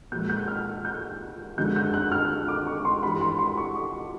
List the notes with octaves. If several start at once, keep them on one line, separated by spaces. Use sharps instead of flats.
A#2 F3 G#3 G6
G6
F6
G6
F#2 D3 F3 G#3 G6
G6
F#6
F6
D6
C#6
C6
G2 E3 G3 B5
C6
C6
C#6
D6